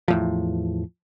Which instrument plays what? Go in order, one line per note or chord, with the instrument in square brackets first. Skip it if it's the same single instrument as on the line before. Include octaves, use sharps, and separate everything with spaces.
[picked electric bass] E2 A2 F3